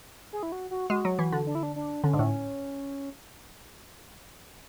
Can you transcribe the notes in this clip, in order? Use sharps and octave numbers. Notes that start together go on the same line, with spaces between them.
G#4
E4
F#4
F#4
G#3 F#4
F#3
E3
D3
D4
E4
D4
D4
D3 C#4
G#2 D4
A2 C#4